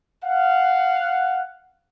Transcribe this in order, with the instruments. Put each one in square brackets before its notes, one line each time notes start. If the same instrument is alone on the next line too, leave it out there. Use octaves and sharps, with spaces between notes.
[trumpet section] F5 F#5